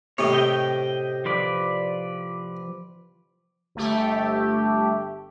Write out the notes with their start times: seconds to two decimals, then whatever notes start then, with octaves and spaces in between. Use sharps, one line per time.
0.18 A2 C3 C#5 D#5
0.32 G4 D#5 G5
1.25 F3 B4 D5
3.75 G1 A3 G4